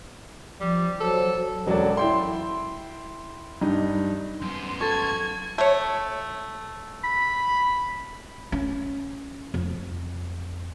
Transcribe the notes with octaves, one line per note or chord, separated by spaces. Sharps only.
F3 G3
F#3 A4 C5
E1 F#3 C#4 A4 D5
E4 G5 C6
G2 D#4
F#2 B3 C6
A4 C#6 G#6 A6
A3 C#5
B5
C#4
F2